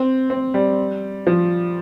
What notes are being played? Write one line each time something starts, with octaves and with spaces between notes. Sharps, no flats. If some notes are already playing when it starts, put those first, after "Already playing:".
Already playing: C4
C4
G3
F3